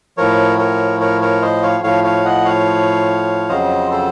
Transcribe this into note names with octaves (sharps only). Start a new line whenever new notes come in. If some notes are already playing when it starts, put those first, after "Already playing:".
A2 F3 A#4 C#5
A#4 C#5
A#4 C#5
A#4 C#5
C5 D#5
C#5 F5
A2 F3 C#5 F5
C#5 F5
D#5 F#5
C#5 F5
F2 C#3 F#3 C5 D#5
A4 C5